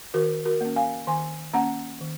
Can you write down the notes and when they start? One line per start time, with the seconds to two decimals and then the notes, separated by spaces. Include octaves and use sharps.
0.14 D#3 F#4 A#4
0.45 F#4 A#4
0.61 A#3 C#4
0.76 F5 G#5
1.07 D#3 G#5 C6
1.54 A#3 C#4 F#5 A#5
2.01 D#3